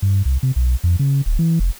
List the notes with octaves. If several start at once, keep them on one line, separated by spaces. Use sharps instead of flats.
G2
C2
C3
B1
F2
C#3
D1
E3
F1